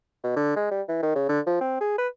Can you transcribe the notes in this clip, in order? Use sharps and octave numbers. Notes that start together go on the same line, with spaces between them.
B2
D3
G#3
G3
E3
D#3
C#3
D3
F3
C4
G#4
B4